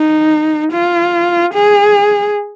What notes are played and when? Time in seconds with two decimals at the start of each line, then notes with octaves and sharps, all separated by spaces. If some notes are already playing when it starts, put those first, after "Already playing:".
Already playing: D#4
0.72 F4
1.54 G#4